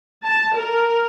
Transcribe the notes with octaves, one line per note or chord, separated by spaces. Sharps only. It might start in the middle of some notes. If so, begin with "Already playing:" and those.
A5
A#4